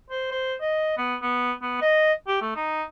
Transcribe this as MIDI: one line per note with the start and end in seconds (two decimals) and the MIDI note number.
0.10 0.28 72
0.31 0.54 72
0.61 0.98 75
0.98 1.16 59
1.22 1.52 59
1.62 1.81 59
1.81 2.13 75
2.28 2.38 67
2.41 2.53 57
2.56 2.83 63